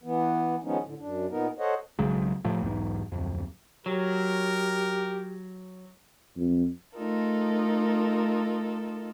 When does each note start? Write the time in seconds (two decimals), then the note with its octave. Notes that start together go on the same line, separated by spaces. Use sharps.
0.04 E3 B3
0.64 D#3 F3 G#3 B3 C#4 D#4
0.84 A2 D3
0.99 F#2 D4
1.30 A#2 B3 D#4 A#4
1.59 A4 C5 C#5 D#5 F#5
1.99 B1 C#3 F#3 G#3
2.45 A2 F3 A3
2.62 B1 E2 G#2
3.12 D1 F2
3.86 F#3 G4 A#4
6.37 F2
6.97 A3 D#4 F4 A4 A#4